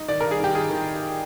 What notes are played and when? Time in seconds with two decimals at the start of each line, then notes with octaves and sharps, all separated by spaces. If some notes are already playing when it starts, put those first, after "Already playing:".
Already playing: D#4
0.08 D#3 D5
0.21 G2 A#4
0.31 G#4
0.40 D#3 G4
0.55 D#3 G#4
0.70 D#3